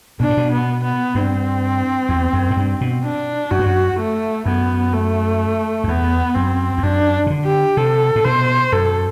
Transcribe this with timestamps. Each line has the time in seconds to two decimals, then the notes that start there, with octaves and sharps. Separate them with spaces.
0.20 B2 D4
0.30 A2
0.37 B2
0.51 B3
0.84 B3
1.15 G2 C4
2.09 E2
2.33 F#2
2.50 A2
2.57 G2
2.81 B2
3.04 D4
3.51 F#2 F#4
3.59 G2
3.66 F#2
3.99 A3
4.46 F#2 B3
4.93 A3
5.84 F#2
5.88 E2 B3
6.35 F#2 C4
6.78 E2
6.83 F#2 D4
7.26 C3
7.30 D3
7.46 G4
7.77 C3 A4
8.16 A2
8.24 B2 C5
8.72 F#2 A4